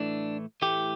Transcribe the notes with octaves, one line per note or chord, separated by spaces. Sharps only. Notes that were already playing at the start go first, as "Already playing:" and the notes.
Already playing: A2 E3 A3 D4
A2 E3 A3 G4